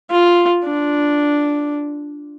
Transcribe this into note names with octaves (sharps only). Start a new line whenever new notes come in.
F4
D4